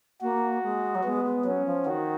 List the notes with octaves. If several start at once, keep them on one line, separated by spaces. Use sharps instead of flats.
A#3 F#4
G#3
F#3
G#3 B3
G#3
F#3 C#4
F3
D#3 F#4